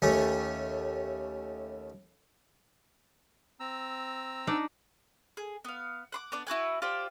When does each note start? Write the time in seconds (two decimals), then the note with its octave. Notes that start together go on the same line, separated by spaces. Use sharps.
0.02 D#2 A3 C#4
3.60 C4 A#5 E6
4.47 D4 D#4 D5
5.37 G#4
5.65 B3 F5
6.12 F#5 C6 D6
6.32 B3 D4 D5
6.47 E4 F#4 B4 G#5
6.82 F4 G4 C5 D5